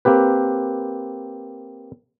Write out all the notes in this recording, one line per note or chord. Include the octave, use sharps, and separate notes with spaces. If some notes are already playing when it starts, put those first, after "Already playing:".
A#3 C4 G4 B4